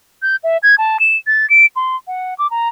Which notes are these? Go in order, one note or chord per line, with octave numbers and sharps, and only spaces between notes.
G6
E5
G#6
A5
E7
A6
D7
C6
F#5
D6
A#5